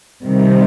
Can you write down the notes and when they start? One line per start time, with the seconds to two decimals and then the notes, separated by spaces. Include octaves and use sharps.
0.23 C3 D#3 G3